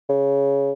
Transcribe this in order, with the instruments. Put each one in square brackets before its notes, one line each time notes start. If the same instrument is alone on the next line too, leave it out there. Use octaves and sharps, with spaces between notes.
[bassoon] C#3